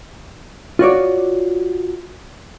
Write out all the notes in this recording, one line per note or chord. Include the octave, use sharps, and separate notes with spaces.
F4 F#4 C#5 D5